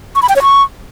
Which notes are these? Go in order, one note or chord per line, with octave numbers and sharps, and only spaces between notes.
C#6
B5
G5
C#5
C#6